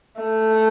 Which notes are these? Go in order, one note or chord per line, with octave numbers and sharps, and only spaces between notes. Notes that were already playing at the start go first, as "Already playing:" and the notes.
A3